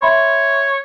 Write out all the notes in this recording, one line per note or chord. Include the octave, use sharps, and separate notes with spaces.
C#5 E5 B5 C6